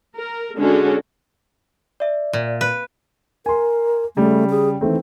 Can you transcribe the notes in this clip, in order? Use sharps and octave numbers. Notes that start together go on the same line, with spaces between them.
A#4
D3 G#3 C#4 D4 F#4 A4
D5 E5
A#2
B4
A#4 G#5 C6
C#3 G3 A3
G#4
D#3 E3 A3 C4